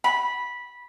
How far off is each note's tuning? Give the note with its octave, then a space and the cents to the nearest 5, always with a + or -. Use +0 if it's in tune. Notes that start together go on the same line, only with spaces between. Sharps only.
B5 -10